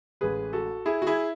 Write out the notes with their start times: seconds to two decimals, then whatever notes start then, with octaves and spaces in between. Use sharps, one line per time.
0.21 A1 A2 G#3 G#4 B4
0.53 F#4 A4
0.86 E4 G#4
1.02 F#4
1.07 E4 G#4